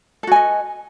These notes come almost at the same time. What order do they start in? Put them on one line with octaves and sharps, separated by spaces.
A4 F#4 G#5 D#5